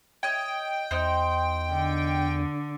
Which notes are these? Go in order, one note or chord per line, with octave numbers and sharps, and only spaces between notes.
C#5 D#5 G5
E2 D#4 C5
D3